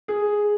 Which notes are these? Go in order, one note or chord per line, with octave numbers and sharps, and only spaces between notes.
G#4